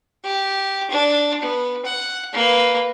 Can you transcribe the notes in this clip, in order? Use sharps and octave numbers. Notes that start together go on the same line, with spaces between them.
G4
D4
B3
F#5
A#3 B4